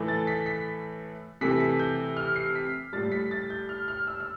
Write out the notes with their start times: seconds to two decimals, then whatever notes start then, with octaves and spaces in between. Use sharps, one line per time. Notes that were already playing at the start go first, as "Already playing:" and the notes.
Already playing: A2 E3 A3
0.08 A6
0.27 B6
0.46 B6
1.41 C3 E3 A3 B6
1.60 B6
1.79 G6
2.16 F6
2.36 C7
2.55 B6
2.93 A2 G3 A6
3.12 B6
3.31 A6
3.50 G6
3.69 F6
3.88 F6
4.07 E6
4.20 E6